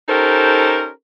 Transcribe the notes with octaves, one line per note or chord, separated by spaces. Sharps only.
C#4 D#4 G4 A4 A#4 C5